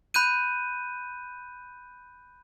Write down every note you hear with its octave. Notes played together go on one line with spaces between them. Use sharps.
B5 F#6 G6 D#7